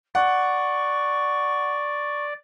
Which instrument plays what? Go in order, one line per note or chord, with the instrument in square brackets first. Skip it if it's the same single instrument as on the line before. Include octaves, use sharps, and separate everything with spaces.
[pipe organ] D5 [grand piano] F#5 [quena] C#6